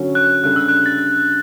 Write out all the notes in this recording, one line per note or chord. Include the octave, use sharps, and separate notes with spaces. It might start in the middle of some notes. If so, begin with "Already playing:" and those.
Already playing: D3 F#3 C#4 F#4 A4
F#6
C#3 G3 D4 A4 F#6
E6
F#6
A6